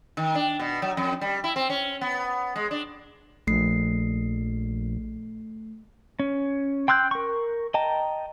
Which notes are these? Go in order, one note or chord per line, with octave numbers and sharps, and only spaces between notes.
D#3
D4
B2
F#3
F2
G3
E4
C4
C#4
B3
G#3
D4
A#1 A3 C7
C#4
G5 C6 E6 F#6 G6
A#4 C#6
D#5 G5 A5 A#5